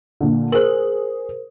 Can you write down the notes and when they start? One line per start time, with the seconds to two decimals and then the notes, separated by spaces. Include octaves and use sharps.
0.21 A#2 D3
0.52 G#4 A#4 C5 F#7